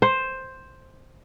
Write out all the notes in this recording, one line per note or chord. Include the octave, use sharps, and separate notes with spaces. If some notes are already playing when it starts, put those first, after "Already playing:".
C5